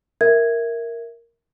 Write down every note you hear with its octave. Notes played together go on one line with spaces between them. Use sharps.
A#4 E5 G#6